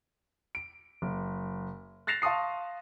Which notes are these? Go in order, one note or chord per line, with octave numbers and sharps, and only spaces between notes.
D7
F#1
F#6 A6 A#6 C7 E7 F7
F5 A5 C6 C#6 D#6 C7